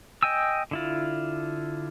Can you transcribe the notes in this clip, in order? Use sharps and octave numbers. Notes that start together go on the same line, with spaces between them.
D#5 G5 G#5 E6
D3 E4 F4